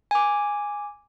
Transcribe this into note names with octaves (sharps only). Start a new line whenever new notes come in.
G#5 D6